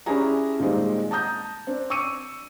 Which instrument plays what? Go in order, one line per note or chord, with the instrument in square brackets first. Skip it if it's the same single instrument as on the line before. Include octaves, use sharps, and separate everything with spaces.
[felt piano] C#4 D4 E4 G4 G#4 A#5
A#2 D#3 G3 G#3 C4
A5 A#5 D#6 G6
C4 D4
C#6 D6 E6 C#7 D#7